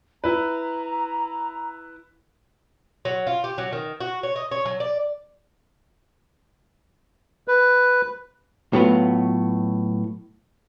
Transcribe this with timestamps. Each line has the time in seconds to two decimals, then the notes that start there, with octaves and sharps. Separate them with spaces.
0.24 E4 B4 A#5
3.05 F#3
3.27 F4
3.44 G4
3.58 F#3
3.73 D#3
4.00 F#4
4.23 C#5
4.36 D#5
4.51 C#5
4.65 F#3
4.80 D5
7.48 B4
8.73 A2 F#3 B3 F4